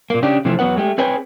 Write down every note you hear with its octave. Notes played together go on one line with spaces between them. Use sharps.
A#2 A#3
C#3 D4 G4
C3 E3 F3 A3 C4
E2 F#3 B3 B4 F#5
G#3 A3 G4
C4 G#4 B4 C#5 G5 G#5